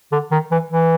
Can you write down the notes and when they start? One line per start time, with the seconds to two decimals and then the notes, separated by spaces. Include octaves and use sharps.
0.12 D3
0.31 D#3
0.51 E3
0.71 E3